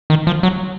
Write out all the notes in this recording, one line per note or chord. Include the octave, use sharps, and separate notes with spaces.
D#3
F3
F#3